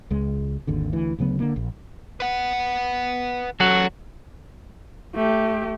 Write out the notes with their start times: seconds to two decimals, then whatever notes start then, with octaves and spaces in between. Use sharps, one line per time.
0.11 C#2 G#3
0.67 G#1 D#2 D3
0.93 D2 E3
1.19 D2 C#3 F#3 B3
1.40 D3 A#3
1.56 A#1
2.20 B4 F#5
3.60 F#3 C#4 F#4 A4
5.15 A3 G4